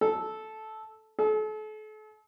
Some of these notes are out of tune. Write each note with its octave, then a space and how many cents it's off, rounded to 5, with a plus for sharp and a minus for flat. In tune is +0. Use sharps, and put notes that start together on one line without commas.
A4 -10
A4 -40